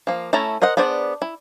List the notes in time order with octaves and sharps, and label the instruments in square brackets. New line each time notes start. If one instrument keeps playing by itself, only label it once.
[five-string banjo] F3 A#3
A3 C#4 E4 A5 A#5
A#4 C5 D#5 F#5
B3 D4 G#4 C5 D5
E4